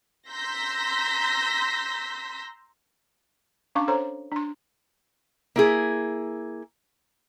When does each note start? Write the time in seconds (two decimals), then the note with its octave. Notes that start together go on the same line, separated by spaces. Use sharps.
0.30 A#5 C6 E6 G6 A#6 B6
3.75 C#4 D4 F5 C#6 D6
3.88 A4 C5 C#5 A#5 C6
4.32 D4 C6
5.56 A#3 E4 G#4